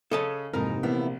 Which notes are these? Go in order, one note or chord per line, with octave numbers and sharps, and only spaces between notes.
C#3 C#4 A4 D#5 A5
F2 G#2 C3 E3 A#3 D#4 A#4
A#1 E3 B3 E4